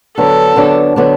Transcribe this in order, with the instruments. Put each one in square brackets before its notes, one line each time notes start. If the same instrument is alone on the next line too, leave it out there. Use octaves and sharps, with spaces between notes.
[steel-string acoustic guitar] D3 F#3 B3 D4 [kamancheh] A4
[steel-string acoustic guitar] D3 F#3 B3 D4
D3 F#3 B3 D4